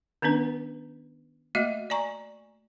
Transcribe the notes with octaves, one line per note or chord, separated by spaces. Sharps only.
D#3 B3 C#4 D4 B4
A3 A#3 F#4 D#5 E5
D5 G#5 A#5 C#6